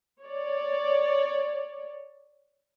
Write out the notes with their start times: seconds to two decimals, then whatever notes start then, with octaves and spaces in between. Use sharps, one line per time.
0.22 C#5 D5